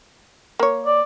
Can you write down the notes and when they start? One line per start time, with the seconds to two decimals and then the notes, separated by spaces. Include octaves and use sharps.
0.59 A#3 C#5
0.86 D5